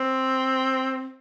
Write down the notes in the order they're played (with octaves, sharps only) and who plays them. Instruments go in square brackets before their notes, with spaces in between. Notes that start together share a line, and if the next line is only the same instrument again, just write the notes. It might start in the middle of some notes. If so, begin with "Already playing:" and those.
Already playing: [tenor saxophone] C4